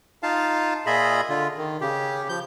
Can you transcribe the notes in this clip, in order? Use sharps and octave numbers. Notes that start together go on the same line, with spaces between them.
D#4 F4 F5 A5
A#2 F4 G#4 D#5 E5 B5
D3 F4
D#3
C#3 G4
F3 G6